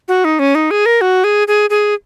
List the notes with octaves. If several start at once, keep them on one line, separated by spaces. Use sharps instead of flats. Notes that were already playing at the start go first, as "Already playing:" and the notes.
F#4
D#4
C#4
D#4
G#4
A#4
F#4
G#4
G#4
G#4